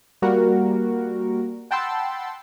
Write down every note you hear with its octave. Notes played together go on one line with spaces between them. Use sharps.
G3 A#3 F#4 A#4
F#5 G5 A5 B5 C6 E6